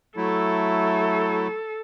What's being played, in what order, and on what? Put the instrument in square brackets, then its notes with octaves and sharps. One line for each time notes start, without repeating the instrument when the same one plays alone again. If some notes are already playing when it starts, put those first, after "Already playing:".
[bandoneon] F#3 A3 E4 [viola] A4